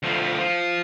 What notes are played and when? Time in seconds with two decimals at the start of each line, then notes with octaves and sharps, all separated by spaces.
0.03 D2 F3
0.39 F3